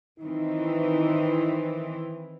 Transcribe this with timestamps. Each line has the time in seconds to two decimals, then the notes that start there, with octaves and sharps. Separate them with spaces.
0.19 D#3 E3 C4 D#4